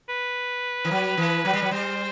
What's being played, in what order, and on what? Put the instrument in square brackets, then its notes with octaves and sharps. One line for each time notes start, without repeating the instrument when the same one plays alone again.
[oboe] B4
[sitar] E3
F#3
E3
F#3
G3
F#3
[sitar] G3 [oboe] C5